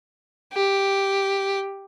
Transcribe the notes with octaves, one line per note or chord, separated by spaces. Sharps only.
G4